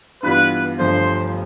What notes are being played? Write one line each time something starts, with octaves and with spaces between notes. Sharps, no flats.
G2 E3 G3 B3 F4 B4
G1 G2 F3 A3 C5